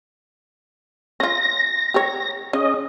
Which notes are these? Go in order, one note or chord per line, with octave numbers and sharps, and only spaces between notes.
C#4 F4 A#6
G4 C#5
C#3 C#4 D#5